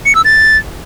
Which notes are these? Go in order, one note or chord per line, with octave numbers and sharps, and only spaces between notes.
C#7
E6
A6